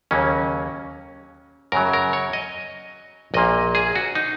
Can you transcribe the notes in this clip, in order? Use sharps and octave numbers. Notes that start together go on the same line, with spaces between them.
D#2 C#3 F#3 A#3 C#4
F#2 C#3 F#3 A#4
A#4
C#5
D#5
A#1 A#2 A#3 D#5
G#4
F#4
D#4